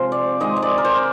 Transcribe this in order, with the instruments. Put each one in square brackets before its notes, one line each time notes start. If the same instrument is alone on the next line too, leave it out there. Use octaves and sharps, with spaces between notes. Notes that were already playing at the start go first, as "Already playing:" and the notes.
Already playing: [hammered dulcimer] C3 F3 G#3 C4 C5 F5
D5
D#3 G#3 C4 D#5
D#5
D5
A#4
C5